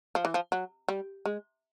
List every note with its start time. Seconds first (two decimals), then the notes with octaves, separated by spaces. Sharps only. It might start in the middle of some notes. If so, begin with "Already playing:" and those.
0.15 F3
0.25 E3
0.34 F3
0.52 F#3
0.89 G3
1.26 G#3